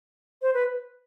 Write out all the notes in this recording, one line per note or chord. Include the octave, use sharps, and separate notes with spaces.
C5
B4